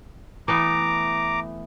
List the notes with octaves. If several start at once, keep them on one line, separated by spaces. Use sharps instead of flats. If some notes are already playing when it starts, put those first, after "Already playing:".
E3 A3 B3 A#5 D6